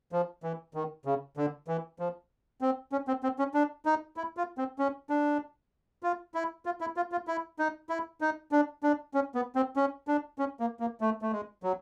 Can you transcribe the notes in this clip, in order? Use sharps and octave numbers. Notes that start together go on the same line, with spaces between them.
F3
E3
D#3
C#3
D3
E3
F3
C4
C#4
C4
C4
C#4
D4
D#4
E4
F4
C4
C#4
D4
F4
E4
F4
E4
F4
F4
E4
D#4
E4
D#4
D4
D4
C#4
B3
C4
C#4
D4
C#4
A#3
A#3
A3
A3
G#3
F#3